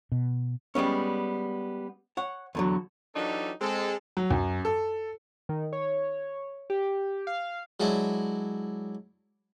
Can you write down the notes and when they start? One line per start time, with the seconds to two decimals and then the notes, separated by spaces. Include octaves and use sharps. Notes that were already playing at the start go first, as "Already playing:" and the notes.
0.12 B2
0.75 G3 G#3 B3 C#4
2.17 C#5 F#5
2.55 E2 D3 F#3
3.16 E3 F#3 D4 D#4 G4 A4
3.61 G#3 C4 A4
4.17 F#3
4.30 F#2
4.65 A4
5.49 D#3
5.73 C#5
6.70 G4
7.27 F5
7.80 F#3 G#3 D4 E4